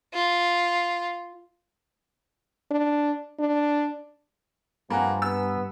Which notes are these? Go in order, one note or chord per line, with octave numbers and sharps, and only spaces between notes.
F4
D4
D4
G2 F3 A#3 F#5 G#5 A#5 B5
B3 E6